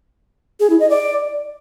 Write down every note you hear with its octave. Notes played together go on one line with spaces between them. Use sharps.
G#4
E4
D#5
D5